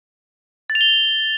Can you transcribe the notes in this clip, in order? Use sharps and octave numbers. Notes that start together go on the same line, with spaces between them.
A6
F7
G7